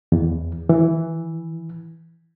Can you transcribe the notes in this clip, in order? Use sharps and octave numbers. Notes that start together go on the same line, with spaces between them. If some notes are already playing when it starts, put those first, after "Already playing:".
E2
E3